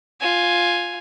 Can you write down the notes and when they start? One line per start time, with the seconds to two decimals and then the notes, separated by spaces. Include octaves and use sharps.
0.21 F4 G#5